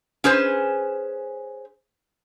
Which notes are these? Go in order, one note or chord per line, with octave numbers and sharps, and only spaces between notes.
C#4 G#4 B4 C5